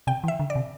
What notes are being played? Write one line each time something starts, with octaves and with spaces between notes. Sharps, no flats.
C3 G5
E3
E5
D3
D5
C3